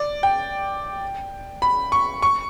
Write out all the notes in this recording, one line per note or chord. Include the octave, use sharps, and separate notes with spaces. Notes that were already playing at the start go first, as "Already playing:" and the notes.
Already playing: D5
G5
B5
C#6
C#6